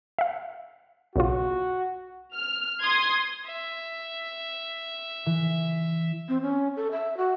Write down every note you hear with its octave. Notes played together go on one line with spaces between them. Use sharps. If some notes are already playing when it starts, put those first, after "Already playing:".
E5 F5
B1 C#3 F4 F#4
F6
C6 D#6 G#6
E5
E3
C4
C#4
A4
E5
F#4